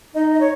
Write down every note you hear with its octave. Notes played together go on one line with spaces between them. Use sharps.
D#4 D#5
D#5
C#5